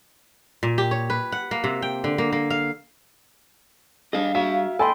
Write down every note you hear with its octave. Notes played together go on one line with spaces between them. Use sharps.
A#2
G4
C#5
B4
F#5
A#3
C3
G5
D3
A#3
A#3
F5
G3 D4 G#4 D#5 F5
F#4 E5 F5
A4 D5 D#5 G5 G#5 B5 C6